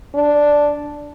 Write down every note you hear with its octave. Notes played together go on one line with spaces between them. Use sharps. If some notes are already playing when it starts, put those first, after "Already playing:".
D4